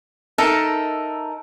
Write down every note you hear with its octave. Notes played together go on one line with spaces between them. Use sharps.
D#4 A4 A#4 E5